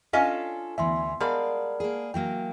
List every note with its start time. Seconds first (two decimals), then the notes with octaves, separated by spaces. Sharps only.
0.13 C#4 D4 F4 A4 D#5 F5
0.78 D2 E3 B3 E5 G#5 C6
1.20 G3 G#3 A#4 D5 F5 F#5 A5
1.80 A#3 G#4
2.14 E3 F#3 A#3 G5